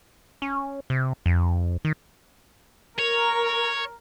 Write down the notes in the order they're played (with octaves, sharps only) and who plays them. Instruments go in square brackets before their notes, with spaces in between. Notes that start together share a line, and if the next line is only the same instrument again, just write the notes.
[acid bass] C#4
C3
F2
D#3
[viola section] A#4 [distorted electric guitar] C#5